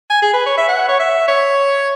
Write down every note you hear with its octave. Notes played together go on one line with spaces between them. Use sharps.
G#5
G#4
B4
C#5
E5
F#5
C#5
E5
C#5